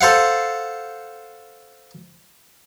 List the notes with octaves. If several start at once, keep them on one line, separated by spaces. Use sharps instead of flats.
A4 C5 F5 F#5